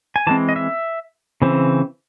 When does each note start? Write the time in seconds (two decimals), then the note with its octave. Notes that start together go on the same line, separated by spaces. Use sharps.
0.16 G#5
0.27 E3 G#3 C4 A5
0.49 D#5
0.56 E5
1.42 C#3 E3 C4